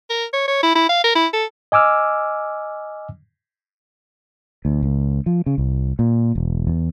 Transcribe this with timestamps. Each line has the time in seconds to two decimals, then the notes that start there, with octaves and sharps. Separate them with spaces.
0.10 A#4
0.33 C#5
0.48 C#5
0.63 E4
0.75 E4
0.89 F5
1.04 A#4
1.15 E4
1.33 A4
1.72 D#5 G#5 D6 E6 F6
4.65 D2
4.83 C#2
5.26 F3
5.46 C#3
5.58 C2
5.99 A#2
6.35 E1
6.67 E2